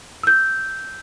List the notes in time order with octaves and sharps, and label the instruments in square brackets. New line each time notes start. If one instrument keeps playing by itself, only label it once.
[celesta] E6 G6